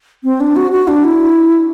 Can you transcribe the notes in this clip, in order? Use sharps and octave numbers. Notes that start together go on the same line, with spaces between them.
C4
D4
F#4
F#4
D4
E4